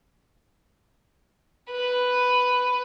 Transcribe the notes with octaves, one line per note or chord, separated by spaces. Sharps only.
B4